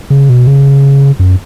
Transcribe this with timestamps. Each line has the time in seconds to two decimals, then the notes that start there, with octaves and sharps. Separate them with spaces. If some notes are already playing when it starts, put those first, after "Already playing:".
0.10 C#3
0.29 B2
0.47 C#3
1.19 F#2